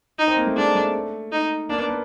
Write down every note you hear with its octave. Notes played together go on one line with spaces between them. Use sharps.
D#4
C4
A#3
A3
G#3 D4
A3
D#4
A#3 D4
B3
B3